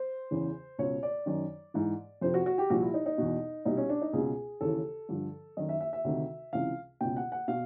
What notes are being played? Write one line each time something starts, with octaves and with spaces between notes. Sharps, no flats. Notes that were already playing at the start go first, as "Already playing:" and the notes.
Already playing: C5
E2 C#3 E3
C#2 B2 C#5
D5
F#2 D#3
G#2 E3
F2 C3 F3 C5
F#4
F#4
G4
C2 A#2 F3 F#4
E4
D#4
D#4
E2 B2
C2 B2 D#4
C#4
D4
D#4
C#2 B2 G#4
D#2 C#3 E3 A4
G2 D3 F3
F#2 D#3 D#5
E5
E5
E5
D2 C3 D#3
C#2 C3 E3 F5
C#2 B2 G5
F#5
F#5
B2 F5